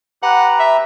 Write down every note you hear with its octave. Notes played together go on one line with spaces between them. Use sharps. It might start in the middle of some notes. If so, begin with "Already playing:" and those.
G4 B4 F#5 A#5
E5